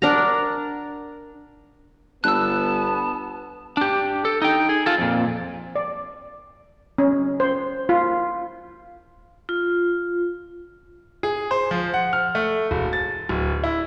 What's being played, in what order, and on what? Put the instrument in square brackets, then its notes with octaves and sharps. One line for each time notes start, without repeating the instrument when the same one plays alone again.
[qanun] D4 A#4 F#5 A#5
[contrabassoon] G1 [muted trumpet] B3 [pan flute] A5 [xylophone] E6 F#6
[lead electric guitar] D4 G4
A4
D#4 G5
G#4
F4 A4
F2 A#2
[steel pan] D5
C#4
C5
F4
[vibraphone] F4
[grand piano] G#4
C5
F3
F#5
F6
A3
E1
A6
D1
E4